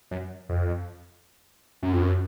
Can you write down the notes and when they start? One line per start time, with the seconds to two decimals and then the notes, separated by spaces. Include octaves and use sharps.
0.11 F#2
0.49 F2
1.82 F#2
1.93 F2
2.02 F#2